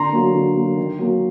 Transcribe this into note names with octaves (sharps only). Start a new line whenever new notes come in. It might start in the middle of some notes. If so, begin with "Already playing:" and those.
Already playing: D3 A#5 C6
F#3 A#3
D3
F#3 A#3
D#3
F#3 A#3